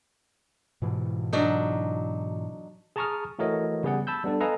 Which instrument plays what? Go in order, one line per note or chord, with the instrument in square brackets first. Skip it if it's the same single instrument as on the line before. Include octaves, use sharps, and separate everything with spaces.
[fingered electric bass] G#2 B2 E3
[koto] F#3 D4 D#4
[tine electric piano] G#4 A5 A#5 C#6 D#6 F6
E3 A3 F#4 A#4 C#5 D#5
C#3 G3 B3 G#4 D5 F#5
A5 B5 E6 G6
G3 B3 D4 A4
A4 B4 D#5 F5 G#5 A#5